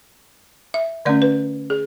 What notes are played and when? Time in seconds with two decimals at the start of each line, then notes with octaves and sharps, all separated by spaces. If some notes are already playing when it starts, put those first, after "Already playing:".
0.74 E5
1.05 D3 A3 C#4 D5
1.22 B4
1.70 G#4